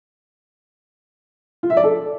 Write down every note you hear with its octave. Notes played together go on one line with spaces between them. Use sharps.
F4
E5
D5
A4